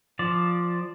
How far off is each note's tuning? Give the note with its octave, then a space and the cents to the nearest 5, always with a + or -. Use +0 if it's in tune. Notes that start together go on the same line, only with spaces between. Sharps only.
F3 +0 D5 +0